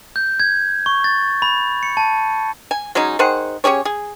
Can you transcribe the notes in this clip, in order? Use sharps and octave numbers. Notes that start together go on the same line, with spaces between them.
G6
G#6
C#6
A6
B5
C#7
A5
G#5
F#3 G#3 C#4 D#4
D#3 G#4 C5 F#5
C#4 G4 G#4 C#5
G#4